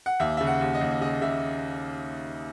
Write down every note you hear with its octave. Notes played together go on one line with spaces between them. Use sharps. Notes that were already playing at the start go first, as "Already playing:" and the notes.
F#5
D#2 E5
C#3 E5
F#5
D#2
D#5
D#2
C#3 D#5
C#3 E5